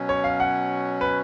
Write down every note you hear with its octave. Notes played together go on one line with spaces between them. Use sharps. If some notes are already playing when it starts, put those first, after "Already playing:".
Already playing: B2 F#3 C#4
C#5
F5
F#5
B4